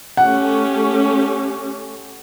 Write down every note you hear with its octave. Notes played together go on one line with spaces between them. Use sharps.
A3 C#4 G4 F#5